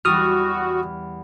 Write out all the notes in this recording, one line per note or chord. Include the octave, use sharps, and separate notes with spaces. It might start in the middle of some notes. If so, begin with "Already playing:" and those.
E2 G3 F#4 D#6 F6